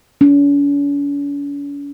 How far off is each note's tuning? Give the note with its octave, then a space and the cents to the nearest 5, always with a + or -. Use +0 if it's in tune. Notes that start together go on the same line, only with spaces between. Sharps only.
C#4 +45